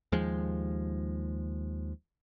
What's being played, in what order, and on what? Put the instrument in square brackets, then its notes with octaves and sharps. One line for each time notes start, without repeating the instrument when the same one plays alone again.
[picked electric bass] D#2 F3 G#3